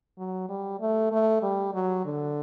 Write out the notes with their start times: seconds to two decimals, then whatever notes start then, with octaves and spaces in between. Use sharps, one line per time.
0.18 F#3
0.49 G3
0.80 A3
1.12 A3
1.43 G3
1.74 F#3
2.05 D3